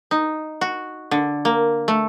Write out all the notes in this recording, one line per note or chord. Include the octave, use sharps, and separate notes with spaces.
D#4
F#4
D3
A#3
A3